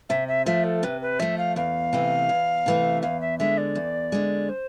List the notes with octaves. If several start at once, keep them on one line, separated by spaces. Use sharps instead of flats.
C3 E5
E5
F3 A3 E5
A4
C3 B4
B4
F3 A3 E5
F5
E2 F5
C3 E3 A3
E2
C3 E3 A3
E2 F5
E5
D3 G#3 E5
D5
E2
D3 G#3
C5